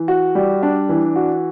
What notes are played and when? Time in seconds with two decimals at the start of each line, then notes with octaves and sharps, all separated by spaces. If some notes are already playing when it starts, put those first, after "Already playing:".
Already playing: E3
0.08 F#4
0.35 G3
0.63 D4
0.89 E3
1.16 F#4